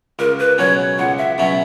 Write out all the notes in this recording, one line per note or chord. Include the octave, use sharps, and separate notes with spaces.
C#2 A#4
B4
B2 F#3 C#4 C#5
C#2 F#5
E5
B2 F#3 C#4 E5